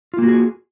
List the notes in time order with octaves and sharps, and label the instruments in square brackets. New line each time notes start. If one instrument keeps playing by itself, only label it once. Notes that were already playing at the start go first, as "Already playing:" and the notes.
[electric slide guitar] F4
A#3
F#4
G#4